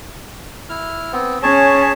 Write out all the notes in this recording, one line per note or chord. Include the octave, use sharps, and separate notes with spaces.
E4 F6
B3 C4
C#4 G#4 C#5 A5